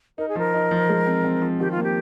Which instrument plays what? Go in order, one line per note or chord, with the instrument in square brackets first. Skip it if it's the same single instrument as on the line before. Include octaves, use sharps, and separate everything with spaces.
[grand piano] D#4 [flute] A#4
[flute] G#4
[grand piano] F3 [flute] A#4
[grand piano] D#4
F3
G#3
C4
C4
F3
[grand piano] D#3 [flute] G4
[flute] F4
[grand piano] A#3
[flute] G4